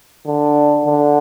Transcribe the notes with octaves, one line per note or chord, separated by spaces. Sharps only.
D3
D3